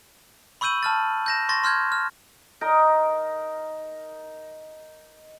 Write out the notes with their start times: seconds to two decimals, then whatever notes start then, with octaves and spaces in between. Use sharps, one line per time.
0.61 B5 C#6 E6 G6 D#7 F#7
0.83 A5 F6 A6
1.26 G6 A#6 E7
1.49 C6 C#6 A6 A#6
1.63 C6 F6 G6 G#6
1.92 F6
2.61 D#4 A#4 D#5